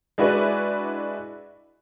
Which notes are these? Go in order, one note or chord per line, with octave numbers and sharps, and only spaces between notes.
G#3 D4 E4 F#4 B4 D5